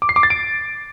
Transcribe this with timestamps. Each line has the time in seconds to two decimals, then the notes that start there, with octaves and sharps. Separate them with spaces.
0.02 D6
0.09 C7
0.16 D6
0.23 A6
0.30 D7